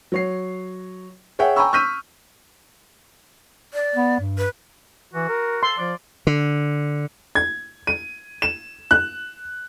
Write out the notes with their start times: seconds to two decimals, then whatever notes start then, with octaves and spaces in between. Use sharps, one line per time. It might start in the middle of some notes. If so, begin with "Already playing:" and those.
0.12 F#3 C#5 C7
1.39 G#4 C#5 E5 F#5 G5
1.56 G5 G#5 A#5 B5 C#6 E6
1.73 C#6 E6 F6 G6 B6 D#7
3.74 D5
3.96 B3
4.20 G2
4.38 B4
5.14 E3 F#4
5.29 A#4
5.63 A4 C6
5.78 F3 D5
6.27 D3
7.35 G#6
7.87 D#7
8.42 E7
8.91 F#6